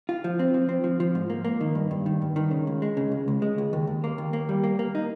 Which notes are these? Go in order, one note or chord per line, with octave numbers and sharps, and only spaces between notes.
F4
F3
C4
F3
C4
F3
F3
G#2
A#3
A#3
D#3
G2
G2
D#3
G2
D#3
C#3
C#2
G#3
C#3
C#2
C#2
G#3
C#2
D#2
D#2
A#3
D#2
A#3
G3
A#3
A#3
D#4